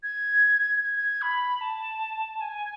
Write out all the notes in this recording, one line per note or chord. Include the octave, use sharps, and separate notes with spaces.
G#6
G#6
B5
A5
G#5